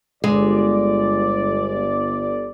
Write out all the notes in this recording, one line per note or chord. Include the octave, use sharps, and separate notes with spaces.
G1 G#3 D5